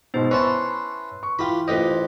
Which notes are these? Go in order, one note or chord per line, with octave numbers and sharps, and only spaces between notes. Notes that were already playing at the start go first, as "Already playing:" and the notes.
G#2 B2 B3 C5
C#4 E4 B4 A5 C6 C#6
C#6
E3 F4 G4 B5
A1 F4 G4 B4 C5 D#5